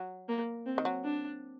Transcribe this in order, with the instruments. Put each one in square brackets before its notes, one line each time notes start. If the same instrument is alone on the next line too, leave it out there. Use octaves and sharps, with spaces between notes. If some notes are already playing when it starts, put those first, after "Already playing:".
Already playing: [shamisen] F#3
[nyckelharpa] A#3
C4
[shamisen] D#3
F#3
[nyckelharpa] D4